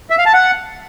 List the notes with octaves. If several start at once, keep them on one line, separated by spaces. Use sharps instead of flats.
E5
F5
A5
F#5